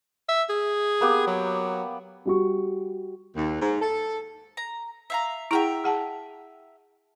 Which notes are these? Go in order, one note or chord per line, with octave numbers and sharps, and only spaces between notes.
E5
G#4
A#3 B3 G4
F#3
G3 F#4 C#6
D#2
G#2
A4
A#5
E5 F5 A#5
E4 G#4 E5 F#5 G5 A#5
G#4 F#5 A5